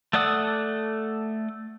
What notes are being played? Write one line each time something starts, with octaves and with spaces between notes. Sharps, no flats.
A3 A4 D5 F#5 D#6